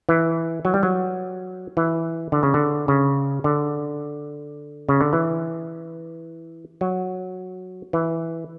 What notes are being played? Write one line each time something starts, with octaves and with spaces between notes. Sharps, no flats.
E3
F#3
G3
F#3
E3
D3
C#3
D3
C#3
D3
C#3
D3
E3
F#3
E3